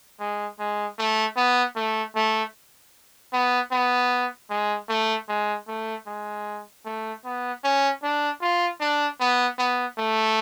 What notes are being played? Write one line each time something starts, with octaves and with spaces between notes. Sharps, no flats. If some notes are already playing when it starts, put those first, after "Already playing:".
G#3
G#3
A3
B3
A3
A3
B3
B3
G#3
A3
G#3
A3
G#3
A3
B3
C#4
D4
F4
D4
B3
B3
A3